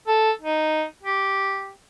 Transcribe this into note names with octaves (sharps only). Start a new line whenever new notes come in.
A4
D#4
G4